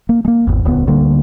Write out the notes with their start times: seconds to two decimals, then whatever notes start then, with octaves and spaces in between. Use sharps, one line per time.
0.09 A#3
0.25 G#3 A#3
0.47 G#1 E2
0.65 D#1 D2 B3
0.87 D2 D3 G3 A#3